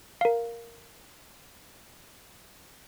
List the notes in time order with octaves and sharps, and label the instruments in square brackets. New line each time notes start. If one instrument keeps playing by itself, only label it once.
[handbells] A#4 F5